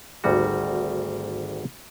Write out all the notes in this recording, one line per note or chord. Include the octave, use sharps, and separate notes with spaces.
G#1 D2 D#3 G3 F#4